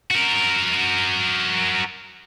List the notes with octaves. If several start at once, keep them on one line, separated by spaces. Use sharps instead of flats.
F#4 A#4